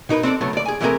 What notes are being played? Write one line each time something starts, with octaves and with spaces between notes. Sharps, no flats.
B2 D#4 A#4 B4
C4 D4 A4 D5
C#3 F#3 A3 B3
D2 D5
G#4 G#5
E3 G#3 A3 C4 G#4 A#4